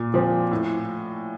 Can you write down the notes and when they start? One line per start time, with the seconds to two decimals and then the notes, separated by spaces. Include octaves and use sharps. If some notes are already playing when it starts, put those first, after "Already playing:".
Already playing: A#2
0.14 F3 C4
0.51 A2